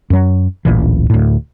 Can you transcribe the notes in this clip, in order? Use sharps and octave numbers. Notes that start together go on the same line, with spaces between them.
F#2 F#3
D1 A1 A#2 E3
D2 A2